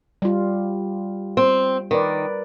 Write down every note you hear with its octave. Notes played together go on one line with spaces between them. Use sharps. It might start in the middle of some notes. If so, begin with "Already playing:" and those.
G3 F4
C4
D#3 A#4 B4 D5